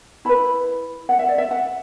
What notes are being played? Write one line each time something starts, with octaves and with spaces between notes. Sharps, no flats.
E4 B4 B5
F#5
E5
D5
E5
F#5